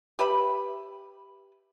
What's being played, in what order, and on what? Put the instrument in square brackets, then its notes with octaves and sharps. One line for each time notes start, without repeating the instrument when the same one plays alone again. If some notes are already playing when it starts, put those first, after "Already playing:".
[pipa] G4 B4 E5 B5